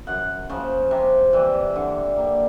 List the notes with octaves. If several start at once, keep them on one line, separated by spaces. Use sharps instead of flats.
F#2 F#5
C#3 F3
C3
E3 G3
D3
G3 A#3